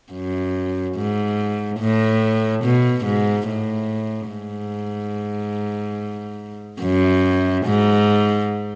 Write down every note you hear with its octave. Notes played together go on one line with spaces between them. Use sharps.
F#2
G#2
A2
B2
G#2
A2
G#2
F#2
G#2